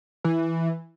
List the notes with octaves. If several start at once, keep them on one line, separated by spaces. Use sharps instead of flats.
E3